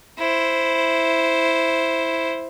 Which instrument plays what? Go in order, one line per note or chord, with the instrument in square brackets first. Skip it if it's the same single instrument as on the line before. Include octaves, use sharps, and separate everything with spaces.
[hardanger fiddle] E4 C5